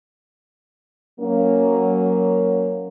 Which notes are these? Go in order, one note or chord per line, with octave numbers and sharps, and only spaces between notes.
F#3 A#3 C#4